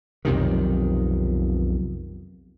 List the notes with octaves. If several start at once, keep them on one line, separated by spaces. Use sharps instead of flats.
B1 F2 C3 D#3